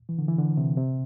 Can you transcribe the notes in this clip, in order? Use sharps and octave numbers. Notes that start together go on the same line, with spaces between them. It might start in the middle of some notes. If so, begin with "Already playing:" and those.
E3
D3
E3
D3
C3
C3